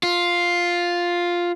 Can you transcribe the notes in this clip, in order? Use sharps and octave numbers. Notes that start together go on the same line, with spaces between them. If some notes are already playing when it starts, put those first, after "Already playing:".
F4